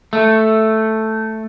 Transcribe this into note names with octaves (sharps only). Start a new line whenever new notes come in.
A3